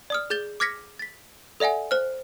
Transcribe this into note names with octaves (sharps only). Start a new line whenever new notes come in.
D5 D#6 F6
G#4 G6 A6 G7
D6 F6 G#6 A#6 B6 C#7
A6 B6
A4 D5 E5 F#5 G#5
C5 F6